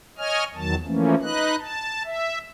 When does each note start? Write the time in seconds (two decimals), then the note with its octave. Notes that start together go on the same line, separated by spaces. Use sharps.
0.18 C#5 D#5 G#5 F6
0.55 E2 D#3 F#3 A5
0.86 E3 F3 A3 A#3 C#4
1.22 D#4 B4 D#5 F#6
1.59 A5
2.05 E5